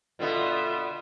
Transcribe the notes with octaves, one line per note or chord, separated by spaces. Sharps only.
B2 D3 B3 F4 E5